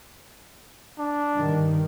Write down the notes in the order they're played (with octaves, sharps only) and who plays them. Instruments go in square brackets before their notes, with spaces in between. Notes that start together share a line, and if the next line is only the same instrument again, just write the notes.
[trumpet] D4
[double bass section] G2 D#3